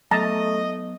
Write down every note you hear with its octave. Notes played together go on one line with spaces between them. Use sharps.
F#3 A3 B3 D#5 A5 A#5